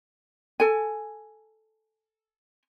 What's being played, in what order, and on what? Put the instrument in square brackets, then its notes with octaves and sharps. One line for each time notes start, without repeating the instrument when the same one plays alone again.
[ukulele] A4 G#5